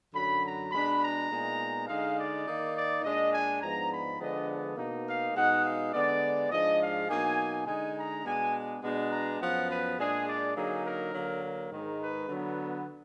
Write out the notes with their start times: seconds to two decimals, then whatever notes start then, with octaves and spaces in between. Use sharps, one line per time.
0.14 F#2 D3 F#3 B5
0.43 A#5
0.72 B2 G#3 D4 B5
1.02 A#5
1.31 A#2 G#3 B3 D#4
1.88 D3 G#3 D#4 F5
2.17 D5
2.46 D#3 A#3 D#4
2.75 D5
3.03 A#2 G#3 D4 D#5
3.32 G#5
3.61 G#2 F3 G#3 B3 D4 A#5
3.90 B5
4.19 D3 F3 G#3 B3 D4 D#5
4.77 B2 A#3 D#4
5.06 F5
5.35 B2 G#3 D#4 F#5
5.64 F5
5.93 D3 G#3 B3 D5
6.50 G#2 F3 G#3 D4 D#5
6.80 F5
7.08 B2 F#3 A#3 D#4 G#5
7.66 D3 G#3 D#4 G#5
7.96 A#5
8.24 B2 G#3 B3 D4 G#5
8.82 B2 G#3 B3 D4
9.10 A#5
9.40 F#2 F3 B3 F#5
9.68 B4
9.98 A#2 G#3 D4 G#4
10.27 D5
10.55 D3 F#3 A#3 D#4 G#4
10.84 A#4
11.13 D3 F#3 A#3
11.42 A#4
11.71 G#2 D#3 G#3 D#4
12.00 B4
12.29 D3 F#3 B3